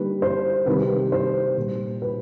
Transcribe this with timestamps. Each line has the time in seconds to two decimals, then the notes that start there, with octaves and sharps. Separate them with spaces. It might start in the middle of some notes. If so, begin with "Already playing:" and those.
Already playing: D3 G3 A#3 D#4 B4
0.22 C5
0.66 C3 D#3 G3 B4
1.12 C5
1.57 A#2 G3 A#3
2.02 B4